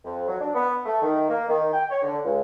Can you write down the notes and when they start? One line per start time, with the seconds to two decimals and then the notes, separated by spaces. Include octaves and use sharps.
0.04 F2
0.28 F#3
0.41 D4
0.54 B3
0.86 A3
1.02 D#3
1.29 A#3
1.48 D#3
1.73 G5
1.90 C#5
2.02 D3
2.24 C#2